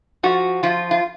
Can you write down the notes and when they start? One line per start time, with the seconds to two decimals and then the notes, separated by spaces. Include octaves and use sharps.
0.23 F3 F#4
0.63 F3 F4
0.91 F4